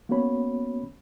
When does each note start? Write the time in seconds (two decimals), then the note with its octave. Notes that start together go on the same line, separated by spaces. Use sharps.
0.09 A#3 B3 C#4 F#4 C#5 B5